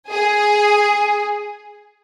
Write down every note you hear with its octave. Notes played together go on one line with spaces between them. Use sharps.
G#4